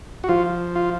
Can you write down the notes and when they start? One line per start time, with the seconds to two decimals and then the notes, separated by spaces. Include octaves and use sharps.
0.24 F#4
0.29 F3 F4
0.75 F4